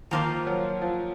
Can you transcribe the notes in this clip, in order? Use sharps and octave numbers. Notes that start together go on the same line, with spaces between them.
D#3 F3 A#3 F4 C5
F#3
F3